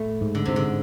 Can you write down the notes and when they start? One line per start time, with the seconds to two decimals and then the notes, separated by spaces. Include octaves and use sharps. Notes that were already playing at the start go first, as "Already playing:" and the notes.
Already playing: A2 A3
0.21 G#2
0.35 D3
0.45 G#2 C3
0.56 D3